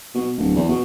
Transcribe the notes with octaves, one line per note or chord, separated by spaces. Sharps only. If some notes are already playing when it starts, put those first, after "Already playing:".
B2
D1
E2
B2